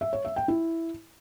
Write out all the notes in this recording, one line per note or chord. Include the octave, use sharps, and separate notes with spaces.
E5
C#5
E5
G5
E4